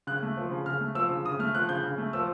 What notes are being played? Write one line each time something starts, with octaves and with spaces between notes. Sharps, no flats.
C#3 F#6
A3
F3
C#3
C#3 F6
A3
F3 E6
C#3
C#3 D#6
A3 F6
F3 F#6
C#3 G6
C#3
A3
F3 E6